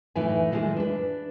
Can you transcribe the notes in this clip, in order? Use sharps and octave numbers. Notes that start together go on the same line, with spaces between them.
A2 E3 D#4 E4 B4 G#5
D#3 E3 G3 G#3
D4 B4